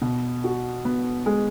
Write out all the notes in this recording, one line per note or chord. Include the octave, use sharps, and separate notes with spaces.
B2
F#4
B3
G#3